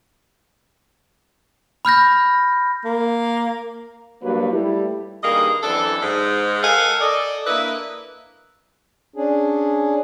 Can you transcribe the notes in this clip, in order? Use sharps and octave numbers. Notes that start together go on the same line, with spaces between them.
B5 F6 G6 A#6
A#3
G2 F#3 A#3 B4
G3 A3 E4
G2 D#3 G3 A#3 G#4 D#5
F#2 E3 C4 D4 A4
G#2
A4 A#4 D#5 F5 F#5 G#5
A4 D5 D#5
A#3 D4 E4 B4 D#5 E5
C#4 D4 G#4